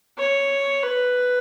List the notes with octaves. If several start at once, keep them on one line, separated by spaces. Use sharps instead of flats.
C#5
B4